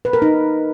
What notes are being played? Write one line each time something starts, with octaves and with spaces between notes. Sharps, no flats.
B4
A#4
D#4